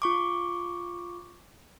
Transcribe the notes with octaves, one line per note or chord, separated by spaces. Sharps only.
F4 C#6 D6